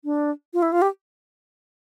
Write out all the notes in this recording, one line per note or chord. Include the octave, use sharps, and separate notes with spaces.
D4
F4
E4
F4
G4